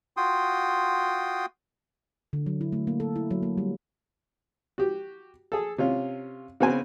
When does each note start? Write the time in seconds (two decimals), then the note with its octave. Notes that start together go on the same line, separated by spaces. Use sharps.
0.17 F4 F#4 G5 C6 D#6
2.33 D3
2.46 F#3
2.61 E4
2.72 A3
2.87 A#3
3.00 A4
3.16 E4
3.31 F#3
3.43 A#3
3.57 G3
4.78 F#4 G4
5.52 G#4 A4
5.78 C3 C#4 F4
6.60 C#3 B3 C4 G#5